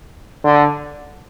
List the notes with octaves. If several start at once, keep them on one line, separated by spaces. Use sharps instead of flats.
D3